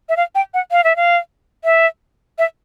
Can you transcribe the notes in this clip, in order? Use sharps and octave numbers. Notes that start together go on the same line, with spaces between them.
E5
F5
G5
F#5
F5
E5
F5
E5
E5